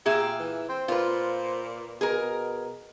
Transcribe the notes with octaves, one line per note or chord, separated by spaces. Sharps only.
A#2 G4 G#4 E5
E3
C4 C5
A#2 F4 B4
B2 G#4 A#4